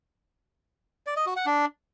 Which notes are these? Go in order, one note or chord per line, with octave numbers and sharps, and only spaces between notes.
D5
D#5
F#4
F#5
D4